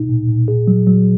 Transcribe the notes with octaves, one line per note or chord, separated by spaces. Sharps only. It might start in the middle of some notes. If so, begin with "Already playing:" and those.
Already playing: B2 D#4
A#2
A#2
G#4
F#3
F#3